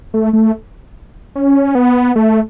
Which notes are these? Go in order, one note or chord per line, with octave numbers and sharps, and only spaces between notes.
A3
A3
C#4
B3
A3